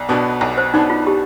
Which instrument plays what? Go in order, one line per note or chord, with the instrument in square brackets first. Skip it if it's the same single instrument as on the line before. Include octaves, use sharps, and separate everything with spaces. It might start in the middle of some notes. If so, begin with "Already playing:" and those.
Already playing: [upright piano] B1 [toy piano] D5
[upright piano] B2 B3 D4
B1
[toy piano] C5
[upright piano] B2 B3 D4 [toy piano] D#4
[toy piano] F4
G4